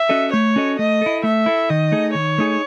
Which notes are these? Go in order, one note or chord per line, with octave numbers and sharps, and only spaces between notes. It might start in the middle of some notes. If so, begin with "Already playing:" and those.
Already playing: E5
C#4 F#4 A4 D#5
A3 C#5
C#4 F#4 A4 D#5
A3 D#5
E4 A4
A3 E5
E4 A4
D#3 D#5
A3 D#4 G#4
D#3 C#5
A3 D#4 G#4